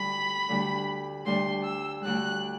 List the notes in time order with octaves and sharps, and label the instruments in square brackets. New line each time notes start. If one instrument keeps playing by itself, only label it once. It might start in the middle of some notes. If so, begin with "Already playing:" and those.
Already playing: [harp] D2 D3 G3 [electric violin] B5
[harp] D2 D3 G3
[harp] D2 D3 G3 [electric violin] C6
[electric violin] E6
[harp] D2 D3 G3 [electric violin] F#6